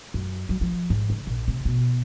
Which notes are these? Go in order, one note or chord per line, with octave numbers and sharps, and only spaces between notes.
F#2
F#3
F3
G#2
C#3
A#1
C3
B2